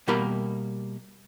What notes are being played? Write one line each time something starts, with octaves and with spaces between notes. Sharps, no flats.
B2 G3 A#3 G4 A#4 B5